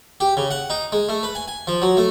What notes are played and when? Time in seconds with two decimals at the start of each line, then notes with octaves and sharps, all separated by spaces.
0.20 G4
0.37 C#3
0.51 F#5
0.70 D#4
0.92 G#3
1.09 A3
1.23 B4
1.35 G#5
1.48 G#5
1.67 F3
1.82 F#3
1.97 A3